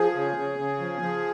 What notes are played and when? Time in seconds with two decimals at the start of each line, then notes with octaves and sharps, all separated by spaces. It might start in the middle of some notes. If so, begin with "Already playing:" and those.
Already playing: F3 G#4
0.15 C#3
0.37 C#3
0.59 C#3
0.79 F3
1.01 F3